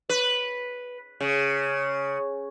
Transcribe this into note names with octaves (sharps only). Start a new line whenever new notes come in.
B4
C#3